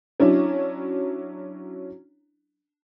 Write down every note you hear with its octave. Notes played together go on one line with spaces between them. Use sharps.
F#3 C#4 D4 E4